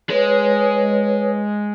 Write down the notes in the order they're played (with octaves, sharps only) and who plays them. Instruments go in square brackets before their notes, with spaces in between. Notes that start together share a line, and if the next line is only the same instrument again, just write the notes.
[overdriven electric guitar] G#3 [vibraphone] B4 C#5